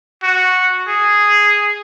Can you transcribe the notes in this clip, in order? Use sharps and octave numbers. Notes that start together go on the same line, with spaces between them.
F#4
G#4